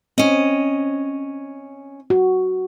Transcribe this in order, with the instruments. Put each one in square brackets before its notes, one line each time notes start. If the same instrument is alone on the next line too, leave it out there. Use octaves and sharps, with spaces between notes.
[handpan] C4 [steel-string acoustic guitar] C#4 D#5
[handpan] F#4